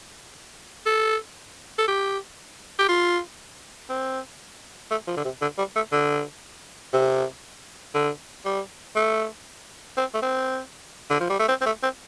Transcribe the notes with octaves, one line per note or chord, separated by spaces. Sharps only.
A4
A4
G4
G4
F4
C4
A3
F3
D3
C3
D3
G3
A3
D3
C3
D3
G3
A3
C4
A3
C4
D3
F3
G3
A3
C4
C4
A3
C4